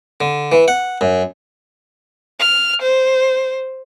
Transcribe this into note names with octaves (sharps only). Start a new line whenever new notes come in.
D3
E3
F#5
F#2
F6
C5